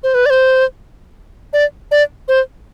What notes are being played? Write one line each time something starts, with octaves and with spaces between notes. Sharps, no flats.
C5
B4
D5
C5
D5
D5
C5